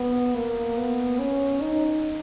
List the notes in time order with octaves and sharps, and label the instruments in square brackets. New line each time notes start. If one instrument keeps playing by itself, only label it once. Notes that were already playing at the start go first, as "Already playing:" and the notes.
Already playing: [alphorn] B3
A#3
B3
C#4
D#4